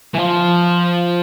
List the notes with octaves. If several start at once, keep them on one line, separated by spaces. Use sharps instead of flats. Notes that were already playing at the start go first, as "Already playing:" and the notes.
E3
F3